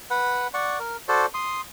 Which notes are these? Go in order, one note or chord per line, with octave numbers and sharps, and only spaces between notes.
B4 F#5
D5 F#5 C#6
A#4
F#4 A4 C5 D5
C6 D#6